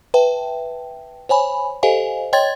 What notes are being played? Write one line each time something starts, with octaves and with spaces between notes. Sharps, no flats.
B4 E5 G5 A5
C5 C#5 G#5 B5
G4 A4 C5 D#5 F5 G#5
C#5 D#5 G5 C6 G#6 A6